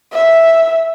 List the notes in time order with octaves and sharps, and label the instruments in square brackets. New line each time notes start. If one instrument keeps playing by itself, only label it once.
[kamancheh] E5